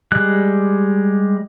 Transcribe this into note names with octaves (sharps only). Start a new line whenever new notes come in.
G3 G#3 F#6